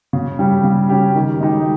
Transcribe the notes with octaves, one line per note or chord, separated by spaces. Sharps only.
C#3
G3 C#4 G4
C#3
G3 C#4 G4
D#3
G#3 D#4 G4